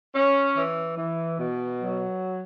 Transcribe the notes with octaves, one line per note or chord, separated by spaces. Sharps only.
C#4
E3
E3
B2
F#3